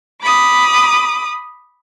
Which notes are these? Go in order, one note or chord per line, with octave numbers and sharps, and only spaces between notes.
B5 D6 D#6